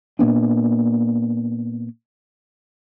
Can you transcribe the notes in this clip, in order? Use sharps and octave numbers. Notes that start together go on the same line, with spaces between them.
A#2 A#3 B3 D4